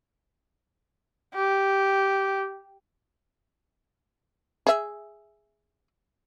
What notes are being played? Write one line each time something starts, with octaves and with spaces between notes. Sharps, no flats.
G4
G#4 E5